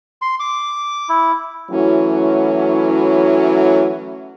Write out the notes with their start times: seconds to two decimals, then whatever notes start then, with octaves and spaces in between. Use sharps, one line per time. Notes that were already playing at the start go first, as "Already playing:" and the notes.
0.22 C6
0.40 D6
1.09 E4
1.71 E3 F#3 A3 C#4 E4 F#4